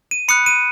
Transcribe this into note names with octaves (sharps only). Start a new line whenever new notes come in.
D#7
B5 D#6 F#6 C#7
D#7